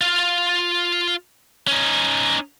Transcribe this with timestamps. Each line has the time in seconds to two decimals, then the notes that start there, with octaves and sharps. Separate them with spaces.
0.01 F4 F5
1.67 C#4 D#4